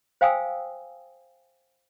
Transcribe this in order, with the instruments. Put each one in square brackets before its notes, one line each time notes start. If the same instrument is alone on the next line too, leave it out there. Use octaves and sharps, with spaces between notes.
[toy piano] C5 F5 G5 G#5 D#6 E6